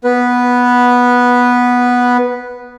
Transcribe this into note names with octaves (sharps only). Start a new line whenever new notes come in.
B3 B4